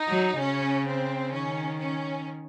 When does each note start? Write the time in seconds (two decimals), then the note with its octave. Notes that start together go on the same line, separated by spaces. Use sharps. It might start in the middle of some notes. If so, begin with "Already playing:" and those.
Already playing: D#4
0.08 F#3
0.39 C#3 C#4
0.86 C4
1.31 D#3 C#4
1.78 C#4